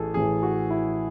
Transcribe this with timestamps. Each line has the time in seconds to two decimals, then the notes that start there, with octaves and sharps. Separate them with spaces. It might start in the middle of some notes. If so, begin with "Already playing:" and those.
Already playing: A1 A2 E3 G#4 A4
0.14 A1 A2 E3 G#4
0.43 F#4
0.70 E4